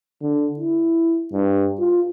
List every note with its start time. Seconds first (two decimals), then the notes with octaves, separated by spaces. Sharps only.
0.21 D3
0.59 E4
1.32 G2
1.80 F4